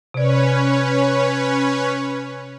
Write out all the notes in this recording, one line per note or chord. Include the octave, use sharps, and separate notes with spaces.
C3 C#4 B4 C#5 D5